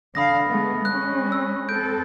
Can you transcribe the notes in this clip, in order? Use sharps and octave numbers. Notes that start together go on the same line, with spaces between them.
D3 F5 B5 D#6 A#6
G#3 A3 B3
G#3 C#4 F#6
E6
C4 A4 G6 D7